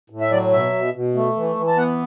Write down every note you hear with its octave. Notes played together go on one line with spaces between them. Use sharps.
A2
E5
F#3 D5
B2 E5
B2
B2
A3
E3
E3
A5
B3 F#5